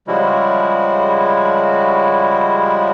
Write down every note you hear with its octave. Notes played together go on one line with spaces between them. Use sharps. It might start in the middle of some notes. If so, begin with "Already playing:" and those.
C#3 F3 G3 G#3 E4 F#4